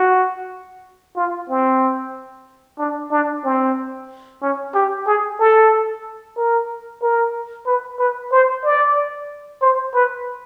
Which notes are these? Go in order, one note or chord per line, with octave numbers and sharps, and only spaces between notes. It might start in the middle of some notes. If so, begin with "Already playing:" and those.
Already playing: F#4
F4
C4
D4
D4
C4
C#4
G4
G#4
A4
A#4
A#4
B4
B4
C5
D5
C5
B4